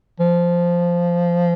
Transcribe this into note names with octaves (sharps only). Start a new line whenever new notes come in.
F3